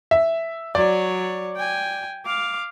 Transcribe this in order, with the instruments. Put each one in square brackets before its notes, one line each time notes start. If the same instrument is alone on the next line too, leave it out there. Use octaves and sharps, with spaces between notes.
[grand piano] E5
[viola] F#3 C#5 [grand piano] D5
[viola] G5 G#5
F5 D6